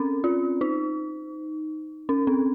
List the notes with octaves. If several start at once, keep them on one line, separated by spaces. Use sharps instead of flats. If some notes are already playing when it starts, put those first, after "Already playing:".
Already playing: C4 C#4
F4
D#4
C#4
C4